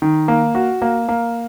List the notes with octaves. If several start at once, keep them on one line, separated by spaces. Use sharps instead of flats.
D#3
A#3
F#4
A#3
A#3